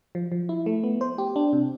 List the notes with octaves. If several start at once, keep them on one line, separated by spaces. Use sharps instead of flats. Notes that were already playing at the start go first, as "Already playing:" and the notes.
F3
F3
E4
A3
B3
C5
G4
D4
C3